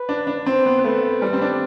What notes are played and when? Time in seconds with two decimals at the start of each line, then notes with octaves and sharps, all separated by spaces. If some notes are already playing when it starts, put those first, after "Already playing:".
Already playing: B4
0.09 D4
0.27 D4
0.46 C4 C5
0.66 B3
0.79 B3
0.84 A3 B4
1.22 G3
1.33 C4
1.41 D4